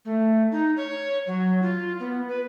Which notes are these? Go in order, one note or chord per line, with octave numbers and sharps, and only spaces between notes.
A3
D#4
C#5
F#3
F4
B3
B4